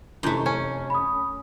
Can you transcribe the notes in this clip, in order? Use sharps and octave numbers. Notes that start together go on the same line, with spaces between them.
F1 F#2 E3 A3 G6
C#4
B5 D#6